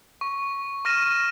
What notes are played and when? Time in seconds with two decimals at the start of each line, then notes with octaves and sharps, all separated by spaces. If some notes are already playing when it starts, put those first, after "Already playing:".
0.21 C#6
0.85 C#6 F6 A#6 D#7 E7